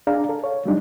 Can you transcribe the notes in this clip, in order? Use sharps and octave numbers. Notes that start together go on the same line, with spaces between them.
D4 G#4 D5 F5 A#5
A4
C#5 F5
F#3 G3 D4 D#4